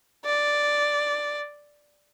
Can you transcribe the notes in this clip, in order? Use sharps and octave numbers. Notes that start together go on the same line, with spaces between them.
D5